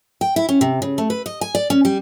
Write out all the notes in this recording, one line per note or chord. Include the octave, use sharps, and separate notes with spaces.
G5
E4
C#4
C3
C#3
A3
B4
D#5
G#5
D5
C#4
G3